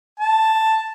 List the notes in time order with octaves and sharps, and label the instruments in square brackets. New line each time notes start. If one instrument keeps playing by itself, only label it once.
[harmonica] A5